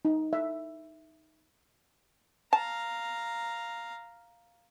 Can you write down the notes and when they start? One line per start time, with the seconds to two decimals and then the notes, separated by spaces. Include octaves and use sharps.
0.05 D#4
0.33 E5
2.53 F5 A5 A#5